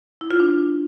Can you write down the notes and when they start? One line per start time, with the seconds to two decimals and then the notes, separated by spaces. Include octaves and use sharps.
0.21 E4
0.31 F4
0.40 D4